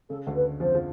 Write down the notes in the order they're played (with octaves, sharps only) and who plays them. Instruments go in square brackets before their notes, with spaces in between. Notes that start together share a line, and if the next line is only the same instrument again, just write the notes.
[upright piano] C#3 [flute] A4
[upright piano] D2 D3
[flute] B4
[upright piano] F2 F3 [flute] C5
[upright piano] F3